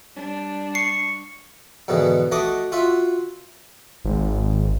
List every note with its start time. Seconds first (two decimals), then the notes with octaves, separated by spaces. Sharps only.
0.15 G3 D4
0.75 C#6 C7
1.88 G#2 B2 D3 E3
2.32 A3 F#4 D#5 D6 D#6
2.72 F4 F#4 E5
4.05 G#1